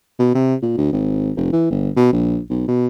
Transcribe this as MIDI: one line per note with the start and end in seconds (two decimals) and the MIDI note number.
0.19 0.34 47
0.35 0.55 48
0.62 0.74 46
0.77 0.92 38
0.92 1.31 32
1.37 1.52 29
1.53 1.67 52
1.71 1.90 31
1.96 2.08 47
2.13 2.39 34
2.50 2.68 35
2.68 2.87 47